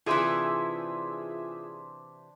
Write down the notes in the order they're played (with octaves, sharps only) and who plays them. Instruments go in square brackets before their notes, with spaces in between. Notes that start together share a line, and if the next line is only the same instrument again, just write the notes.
[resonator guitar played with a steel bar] C3 E3 [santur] D4 C5 [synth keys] F4 G#4 E5